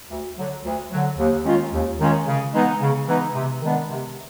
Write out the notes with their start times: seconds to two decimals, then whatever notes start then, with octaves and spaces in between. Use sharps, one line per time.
0.10 D2
0.37 D3 F#3
0.65 D2
0.91 D3 F#3
1.18 D#2
1.45 D#3 G#3 C#4 F4
1.72 D#2
1.99 D#3 G#3 C#4 F4
2.27 C#3
2.53 E3 G#3 B3 D#4
2.81 C#3
3.07 E3 G#3 B3 D#4
3.35 C3
3.61 D#3 G#3 B3 D4
3.89 C3